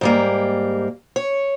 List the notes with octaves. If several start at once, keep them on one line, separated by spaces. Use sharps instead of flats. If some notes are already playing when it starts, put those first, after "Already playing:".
G#2 G3 A#3
C#5